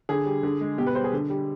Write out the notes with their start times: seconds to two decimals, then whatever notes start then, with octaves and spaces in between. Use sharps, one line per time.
0.09 D3 G#4
0.26 G3
0.43 D3
0.61 G#3
0.78 B2 G4
0.87 B4
0.95 G3 C5
1.04 G#4
1.13 D3
1.30 G3